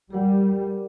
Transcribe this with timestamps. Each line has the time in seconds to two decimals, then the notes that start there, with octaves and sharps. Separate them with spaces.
0.10 G3 G4 A#4 F#5